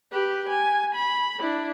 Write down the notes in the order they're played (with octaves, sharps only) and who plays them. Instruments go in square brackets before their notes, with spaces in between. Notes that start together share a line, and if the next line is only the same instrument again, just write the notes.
[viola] G4 B4
G#5
B5
D4 E4